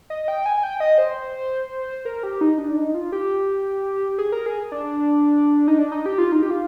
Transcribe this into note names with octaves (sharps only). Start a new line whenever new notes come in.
D#5
G5
G#5
G5
D#5
C5
A#4
G4
D#4
D4
D#4
F4
G4
G#4
A#4
G#4
D4
D#4
D4
D#4
G4
F4
D#4
G4
F4